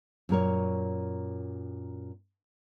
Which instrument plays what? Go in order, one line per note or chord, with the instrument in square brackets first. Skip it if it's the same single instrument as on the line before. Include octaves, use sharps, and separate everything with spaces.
[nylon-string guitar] F#2 A#2 A#4 C#5